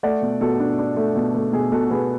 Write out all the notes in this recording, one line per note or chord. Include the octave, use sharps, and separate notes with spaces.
A3 D5 F#5
B2
B2 F#4 A4
D4
D4
A3
B2
A3
B2 G#4
B2 F#4 A4
B2 G#4 B4